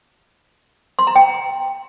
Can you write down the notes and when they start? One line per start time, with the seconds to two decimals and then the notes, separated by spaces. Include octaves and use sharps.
0.99 C6
1.07 A#5
1.16 G5